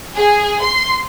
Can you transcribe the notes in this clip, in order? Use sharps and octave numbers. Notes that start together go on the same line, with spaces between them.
G#4
C6